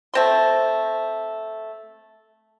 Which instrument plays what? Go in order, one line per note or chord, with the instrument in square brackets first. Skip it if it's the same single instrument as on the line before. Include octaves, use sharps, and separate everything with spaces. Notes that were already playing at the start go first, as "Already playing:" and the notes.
[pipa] A3 C4 C6